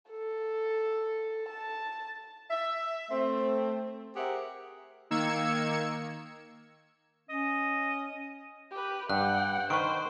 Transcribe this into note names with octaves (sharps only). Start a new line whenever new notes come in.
A4
A5
E5
A3 C4
G4 G#4 A#4 C5 E5 F#5
D#3 A#3 E6 G#6 C#7
C#4 D#5
G4 B4
G2 F#5 G5 F#6
D#3 B4 C5 C#6 F6 D7